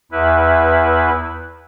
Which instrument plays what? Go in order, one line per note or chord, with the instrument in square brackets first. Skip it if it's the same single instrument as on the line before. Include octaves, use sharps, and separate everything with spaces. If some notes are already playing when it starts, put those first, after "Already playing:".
[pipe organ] E2 E4 B4